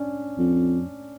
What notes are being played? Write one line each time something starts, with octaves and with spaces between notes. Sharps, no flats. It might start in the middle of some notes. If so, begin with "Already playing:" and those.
Already playing: C#4 D4
F2